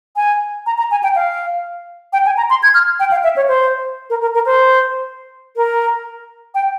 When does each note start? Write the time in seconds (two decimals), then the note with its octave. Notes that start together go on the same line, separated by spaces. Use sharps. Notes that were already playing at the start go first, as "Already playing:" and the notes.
0.16 G#5
0.66 A#5
0.78 A#5
0.91 G#5
1.03 G5
1.16 F5
2.13 G5
2.26 G#5
2.37 A#5
2.50 C6
2.63 G#6
2.74 F6
3.00 G5
3.11 F5
3.24 E5
3.36 C#5
3.48 C5
4.10 A#4
4.21 A#4
4.34 A#4
4.46 C5
5.56 A#4
6.55 G5